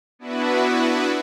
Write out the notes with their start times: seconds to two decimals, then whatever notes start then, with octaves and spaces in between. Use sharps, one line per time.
0.19 B3 D4 E4 F#4 B4